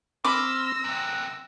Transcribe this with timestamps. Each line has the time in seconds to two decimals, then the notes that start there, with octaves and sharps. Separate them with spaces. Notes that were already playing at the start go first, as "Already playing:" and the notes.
0.24 C4 B5 C6 D6 E6 F6 A#6
0.84 F#2 C3 F#6